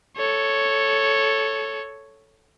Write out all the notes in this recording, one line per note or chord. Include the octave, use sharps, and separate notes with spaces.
A4 C#5